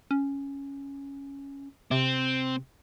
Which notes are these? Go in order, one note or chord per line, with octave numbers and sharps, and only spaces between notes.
C#4
C3 C4